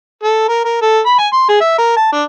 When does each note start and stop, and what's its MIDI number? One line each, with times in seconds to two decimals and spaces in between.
0.23 0.47 69
0.49 0.64 70
0.65 0.79 70
0.82 0.99 69
1.06 1.18 83
1.18 1.27 80
1.33 1.44 84
1.49 1.61 68
1.61 1.77 76
1.78 1.94 70
1.97 2.08 81
2.12 2.22 62